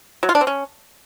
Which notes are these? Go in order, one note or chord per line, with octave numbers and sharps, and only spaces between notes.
F#3
F4
D4
C4
C#4